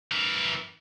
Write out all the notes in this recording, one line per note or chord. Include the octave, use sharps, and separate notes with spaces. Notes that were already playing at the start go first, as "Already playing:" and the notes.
E3 A#4